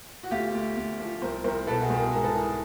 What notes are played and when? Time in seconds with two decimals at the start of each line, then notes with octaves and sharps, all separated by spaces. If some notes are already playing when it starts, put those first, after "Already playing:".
0.23 F#4
0.31 D2 F4 G4
0.55 D2
0.77 D2
1.00 F3
1.22 C2 A#4 C5
1.44 C2 A#4 C5
1.67 B2 A4 B4
1.82 F#4 G#4
1.90 C2
1.97 G#4 A#4
2.13 G#2 G#4 A#4
2.23 A4 B4
2.35 E3 G#4 A#4